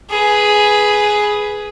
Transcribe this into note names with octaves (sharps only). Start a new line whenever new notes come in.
G#4 B4